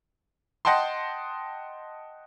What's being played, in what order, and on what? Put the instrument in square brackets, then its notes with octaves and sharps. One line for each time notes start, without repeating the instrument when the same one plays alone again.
[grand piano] D#5 F#5 G5 A5 C6